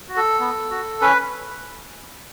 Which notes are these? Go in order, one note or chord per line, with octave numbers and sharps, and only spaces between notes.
F#4
A4
B3
F#4
C#4 B4